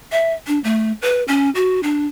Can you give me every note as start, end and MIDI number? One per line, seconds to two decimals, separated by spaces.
0.12 0.33 76
0.47 0.59 62
0.64 0.92 57
1.02 1.23 71
1.28 1.50 61
1.55 1.80 66
1.83 2.06 62